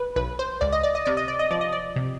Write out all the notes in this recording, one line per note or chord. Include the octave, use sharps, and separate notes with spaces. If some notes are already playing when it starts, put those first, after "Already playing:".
Already playing: B4
B1 B4
C5
C#2 D5
D#5
D5
D#5
C3 D5
D#5
D5
D#5
F3 D5
D#5
D5
C3